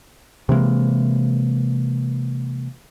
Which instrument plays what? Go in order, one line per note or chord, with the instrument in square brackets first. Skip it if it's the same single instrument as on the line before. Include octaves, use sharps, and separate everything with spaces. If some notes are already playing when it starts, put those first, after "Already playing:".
[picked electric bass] C3 E3 G#3 A#3